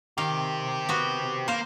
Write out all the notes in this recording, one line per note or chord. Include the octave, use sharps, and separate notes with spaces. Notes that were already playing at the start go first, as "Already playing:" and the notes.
D#3 C4 G4 F5
B3 F#4
A#3 C5 F5